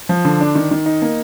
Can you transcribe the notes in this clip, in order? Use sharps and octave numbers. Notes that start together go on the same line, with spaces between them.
F3
D3
D4
D#3
D#3
D#4
A#3